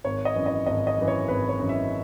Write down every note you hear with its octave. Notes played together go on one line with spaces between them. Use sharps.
G#1 C#5
D#5
F#2 E3
D#5
G#1 D#5
D#5
F#2 E3
C#5
G#1 B4
C#5
F#2 E3
E5